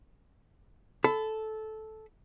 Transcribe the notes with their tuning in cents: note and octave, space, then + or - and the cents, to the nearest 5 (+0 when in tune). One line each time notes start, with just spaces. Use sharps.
A4 -10 B5 +25